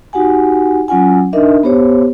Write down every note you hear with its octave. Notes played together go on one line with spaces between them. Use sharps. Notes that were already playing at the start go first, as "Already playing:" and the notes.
D#4 F#4 G4 F#5 G#5
F#3 C#4 F4 F#5 G#5
D4 D#4 A#4 D#5 E5
B3 G4 C5 C#5